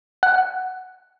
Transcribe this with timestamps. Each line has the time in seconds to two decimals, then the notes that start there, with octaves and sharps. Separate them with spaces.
0.23 F#5